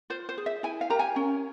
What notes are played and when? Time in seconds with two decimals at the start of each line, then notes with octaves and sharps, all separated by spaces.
0.10 F4 C5
0.29 C5
0.38 G#4
0.46 E5
0.63 E4 G#5
0.81 F5
0.90 G4 A#4 A#5
0.99 G#5
1.16 C#4